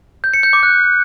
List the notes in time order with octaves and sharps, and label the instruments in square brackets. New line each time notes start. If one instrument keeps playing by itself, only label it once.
[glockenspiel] G6
C#7
G6
D6
F#6